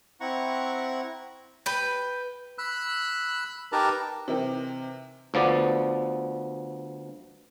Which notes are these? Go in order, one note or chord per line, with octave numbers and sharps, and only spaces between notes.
C4 E4 F#5 A#5 C#6
B4 G5
B5 E6 F#6
D#4 G4 A#4 B4 A5 A#5
C3 E3 D#4 A#4 G5
D2 F3 B3 D5